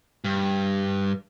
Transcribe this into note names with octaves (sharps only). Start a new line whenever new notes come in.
G2